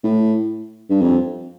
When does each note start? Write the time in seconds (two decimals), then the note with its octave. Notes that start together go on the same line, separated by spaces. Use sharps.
0.04 A2
0.90 G2
1.02 F2